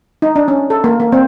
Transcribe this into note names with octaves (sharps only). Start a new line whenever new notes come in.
D#4
D4
C#4
A4
A#3
A#3
C4